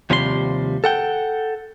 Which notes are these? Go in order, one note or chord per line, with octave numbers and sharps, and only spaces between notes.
D#2 C3 F3 G3 G4 C6
A4 F#5 G5